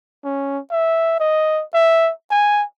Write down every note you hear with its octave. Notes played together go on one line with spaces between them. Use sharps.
C#4
E5
D#5
E5
G#5